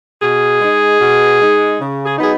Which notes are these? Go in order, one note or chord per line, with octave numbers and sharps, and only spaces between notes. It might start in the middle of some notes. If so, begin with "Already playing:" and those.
B2 G#4
G#3 D#4
B2
G#3 D#4
C#3
G#4
F#3 B3 D#4 G#4